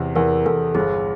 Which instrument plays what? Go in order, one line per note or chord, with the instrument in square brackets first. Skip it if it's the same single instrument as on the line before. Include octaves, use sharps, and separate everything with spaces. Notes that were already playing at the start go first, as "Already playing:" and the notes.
Already playing: [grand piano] E2 C3
[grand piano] E2 [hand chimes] A#4
[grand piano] E2 [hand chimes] A4
[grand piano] G1 [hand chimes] G#4